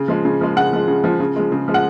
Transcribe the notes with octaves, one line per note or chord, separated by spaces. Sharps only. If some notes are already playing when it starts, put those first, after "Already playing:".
Already playing: C#3
F3 G#3
C#3
F3 G#3
C#3 F#5
F3 G#3
C#3
F3 G#3
C#3
F3 G#3
C#3
F3 G#3
F#5